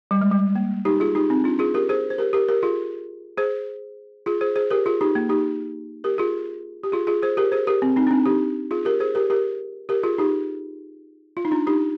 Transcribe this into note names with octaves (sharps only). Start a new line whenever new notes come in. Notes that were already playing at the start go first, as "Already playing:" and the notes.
G3
G#3
G3
A#3
D#4 G4
F4 G#4
D#4 G4
C4 D#4
D4 F4
F4 G#4
G4 A#4
G#4 C5
C5
G4 A#4
G4 A#4
G4 A#4
F4 G#4
G#4 C5
F4 G#4
G#4 C5
G#4 C5
G4 A#4
F4 G#4
D#4 G4
A#3
D#4 G4
G4 A#4
F4 G#4
G4
F4 G#4
F4 G#4
G#4 C5
G4 A#4
G#4 C5
G4 A#4
C4
C4 D#4
D4
C4 D#4
D#4 G4
F4 G#4
G4 A#4
G#4 C5
G4 A#4
G4 A#4
G4 A#4
F4 G#4
D#4 G4
F4
D#4
D4 F4
D#4 G4